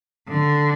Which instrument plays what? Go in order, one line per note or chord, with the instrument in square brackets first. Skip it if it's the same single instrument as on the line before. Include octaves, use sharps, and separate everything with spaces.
[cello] D3